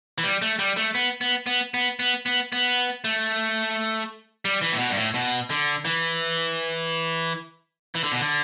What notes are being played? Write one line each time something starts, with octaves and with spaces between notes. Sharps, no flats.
E3
G3
A3
G3
A3
B3
B3
B3
B3
B3
B3
B3
A3
G3
E3
A2
B2
G2
A2
B2
D3
E3
E3
D3
B2
D3